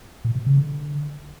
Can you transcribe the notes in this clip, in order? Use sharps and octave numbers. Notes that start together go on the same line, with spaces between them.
A#2
B2
C#3
D3